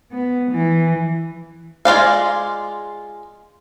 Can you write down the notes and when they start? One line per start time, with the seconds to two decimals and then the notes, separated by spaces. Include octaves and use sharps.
0.12 B3
0.51 E3
1.85 G#3 F4 D5 F5